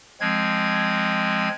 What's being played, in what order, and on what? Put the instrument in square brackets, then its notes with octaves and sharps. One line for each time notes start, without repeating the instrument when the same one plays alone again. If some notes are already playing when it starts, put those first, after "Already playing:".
[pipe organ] F3 G#3 C4 G#6